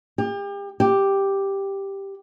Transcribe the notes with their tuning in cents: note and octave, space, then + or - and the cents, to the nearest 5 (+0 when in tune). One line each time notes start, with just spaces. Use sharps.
G4 +35
G4 +0